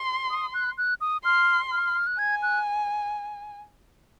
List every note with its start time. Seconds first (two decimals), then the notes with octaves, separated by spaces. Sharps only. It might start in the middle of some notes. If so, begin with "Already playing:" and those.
Already playing: C6
0.30 D#6
0.54 F#6
0.78 F#6
1.01 D#6
1.24 C6 F6
1.72 F6
2.07 F#6
2.19 G#5 G#6
2.42 F#6